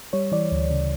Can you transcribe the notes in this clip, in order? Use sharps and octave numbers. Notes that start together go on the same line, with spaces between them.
G3 C#5
E3 D5
D2
C#3